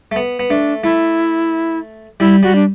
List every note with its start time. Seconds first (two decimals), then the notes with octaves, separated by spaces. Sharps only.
0.12 A3
0.16 B3
0.39 B3
0.49 A3 D4
0.84 A3 E4
2.20 G3 E4
2.43 G3 F#4
2.55 D4